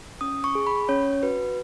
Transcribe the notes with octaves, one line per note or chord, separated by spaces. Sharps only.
C#4 D#6
C#6
G#4
B5
C#4 C#5
F#4 B4